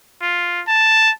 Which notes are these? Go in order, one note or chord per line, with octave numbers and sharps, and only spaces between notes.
F4
A5